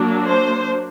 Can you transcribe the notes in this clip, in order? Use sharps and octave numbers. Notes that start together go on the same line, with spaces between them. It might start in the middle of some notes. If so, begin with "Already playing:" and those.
Already playing: F#3 A#3 D4
C5